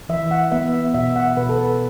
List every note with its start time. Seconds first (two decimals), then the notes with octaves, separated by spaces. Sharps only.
0.09 E3 E5
0.31 F#5
0.52 B3 E5
0.94 B2 E5
1.16 F#5
1.37 B2 B4
1.49 A4
1.58 B4